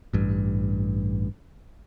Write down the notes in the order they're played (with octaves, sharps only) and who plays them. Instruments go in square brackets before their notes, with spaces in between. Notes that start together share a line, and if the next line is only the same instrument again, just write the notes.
[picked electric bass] A1 G2